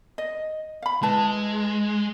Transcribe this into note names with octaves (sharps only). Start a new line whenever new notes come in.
D#5
F5 B5
G#3 E4 B4 A5